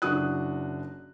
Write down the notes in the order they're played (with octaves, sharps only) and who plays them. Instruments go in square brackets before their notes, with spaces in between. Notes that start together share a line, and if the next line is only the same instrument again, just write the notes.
[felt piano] F#1 D4 F#4 D#6 F#6